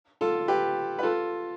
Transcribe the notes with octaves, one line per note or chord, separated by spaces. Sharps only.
F4 A4
G4 B4
B4
F4 A4